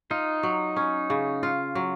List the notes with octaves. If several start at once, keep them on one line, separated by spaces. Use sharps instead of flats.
D#4 F4
F#3
C#4
C#3
F4
F#3